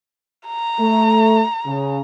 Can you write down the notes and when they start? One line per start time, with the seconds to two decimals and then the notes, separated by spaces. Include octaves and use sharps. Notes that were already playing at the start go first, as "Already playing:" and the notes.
0.47 A#5
0.80 A3
1.67 C#3